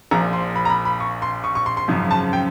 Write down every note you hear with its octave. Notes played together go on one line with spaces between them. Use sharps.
A#1 A#2 F3 A#5
C6
B5
A#5
B5
B5
C#6
C6
C#6
C#6
C6
C6
G#1 F#2 C#3 F3
A5
G5